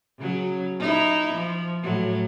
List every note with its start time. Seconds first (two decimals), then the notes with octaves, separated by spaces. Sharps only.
0.19 C#3 F#3
0.80 D#4 E4
1.34 F3
1.83 A2 F#3